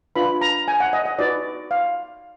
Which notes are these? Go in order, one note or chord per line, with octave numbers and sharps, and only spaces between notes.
D4 F4 B4 B5
A#5
G#5
F#5
D#5
D#5
D#4 F#4 B4 D5
F5